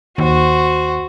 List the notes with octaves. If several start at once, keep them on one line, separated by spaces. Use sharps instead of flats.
D#2 F#4 C5